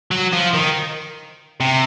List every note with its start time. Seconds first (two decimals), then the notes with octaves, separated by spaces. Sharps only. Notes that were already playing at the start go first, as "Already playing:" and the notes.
0.11 F#3
0.33 F3
0.54 D#3
1.60 C3